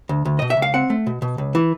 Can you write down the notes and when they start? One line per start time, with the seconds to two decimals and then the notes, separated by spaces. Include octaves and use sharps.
0.09 D2
0.25 D2
0.39 B2 D#5
0.50 E5
0.57 C#2
0.62 F5
0.74 C4 F#5
0.90 A3
1.07 B2
1.22 B2
1.38 C#2
1.55 E3